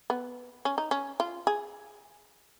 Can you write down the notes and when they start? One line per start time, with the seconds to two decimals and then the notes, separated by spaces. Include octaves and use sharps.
0.10 B3
0.65 C#4
0.78 D#4
0.91 C#4
1.20 F4
1.47 G#4